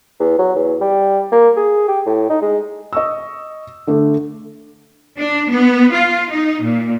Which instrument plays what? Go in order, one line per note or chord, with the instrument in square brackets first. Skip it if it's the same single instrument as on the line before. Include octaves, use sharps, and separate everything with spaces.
[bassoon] E2
F#3
E2
G3
A#3
G#4
G4
A2
D#4
G#3
[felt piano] D#5 C#6 E6
D3 A3 D4
[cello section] D4
B3
F4
D#4
A#2